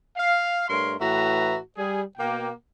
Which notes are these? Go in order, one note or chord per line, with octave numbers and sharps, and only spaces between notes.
F5
G2 A3 A#4 C#5 C6
A2 E3 F#4 B4 E5 A#5
G3 G#4
B2 A#3 G5